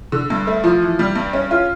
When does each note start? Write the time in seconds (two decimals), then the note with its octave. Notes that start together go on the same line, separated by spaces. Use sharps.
0.12 D3
0.30 G2
0.47 A3
0.64 F3
0.82 E3
0.99 G3
1.16 G2
1.33 C#4
1.51 F4